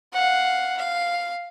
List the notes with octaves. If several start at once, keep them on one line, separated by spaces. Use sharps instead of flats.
F5 F#5
F5